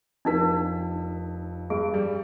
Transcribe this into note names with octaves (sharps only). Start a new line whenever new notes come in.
F1 F2 D4 D#4 A#4 B6
G2 G#4
G3